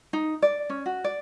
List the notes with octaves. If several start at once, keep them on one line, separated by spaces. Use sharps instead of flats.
D#4
D5
C#4
F#4
D5